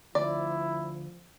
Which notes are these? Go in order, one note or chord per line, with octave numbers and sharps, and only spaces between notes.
D2 F3 E4 D5